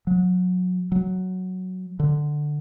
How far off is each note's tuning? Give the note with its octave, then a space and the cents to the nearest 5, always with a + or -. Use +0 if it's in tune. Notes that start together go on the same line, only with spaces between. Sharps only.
F#3 -25
F#3 +0
D3 +10